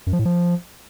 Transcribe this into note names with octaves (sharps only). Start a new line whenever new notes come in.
F#2
F3
A2
F3